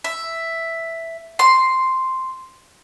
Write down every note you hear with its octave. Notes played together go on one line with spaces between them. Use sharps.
E5
C6